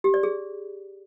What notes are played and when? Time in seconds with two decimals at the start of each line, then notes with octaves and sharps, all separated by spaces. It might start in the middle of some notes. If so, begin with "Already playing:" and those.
0.04 G4
0.14 D5
0.23 G#4